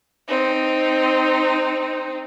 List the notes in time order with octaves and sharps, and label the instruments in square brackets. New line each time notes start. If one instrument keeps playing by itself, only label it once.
[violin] C4 D#4